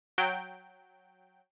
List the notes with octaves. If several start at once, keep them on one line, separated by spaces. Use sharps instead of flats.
F#3 G5